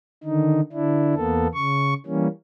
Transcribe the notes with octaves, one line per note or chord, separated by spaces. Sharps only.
D3 D#3 D#4
D3 D4 E4
E2 A#3 B3 A4
C#3 C#6
E3 G3 A#3 C#4